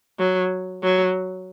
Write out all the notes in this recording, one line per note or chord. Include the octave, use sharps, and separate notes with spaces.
F#3
F#3